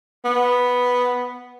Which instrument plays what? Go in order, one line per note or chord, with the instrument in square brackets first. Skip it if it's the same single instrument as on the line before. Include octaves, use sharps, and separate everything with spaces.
[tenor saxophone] B3